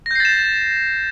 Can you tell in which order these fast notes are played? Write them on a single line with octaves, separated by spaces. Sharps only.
A#6 G6 C7 A6 E7